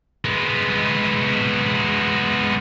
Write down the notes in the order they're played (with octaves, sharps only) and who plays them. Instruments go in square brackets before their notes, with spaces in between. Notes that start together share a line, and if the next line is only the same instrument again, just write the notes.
[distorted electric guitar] G#3 B3